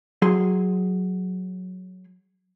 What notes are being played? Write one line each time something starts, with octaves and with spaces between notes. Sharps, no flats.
F#3 G#4 C6